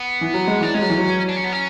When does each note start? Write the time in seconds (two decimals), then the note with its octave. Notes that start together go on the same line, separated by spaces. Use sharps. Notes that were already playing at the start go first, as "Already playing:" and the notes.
Already playing: B3
0.21 E3
0.34 F#3
0.47 G#3
0.61 E3 D4
0.74 G#3 C#4
0.82 F#3
0.89 E3
0.98 F#3
1.29 D4
1.36 C#4
1.44 B3
1.52 C#4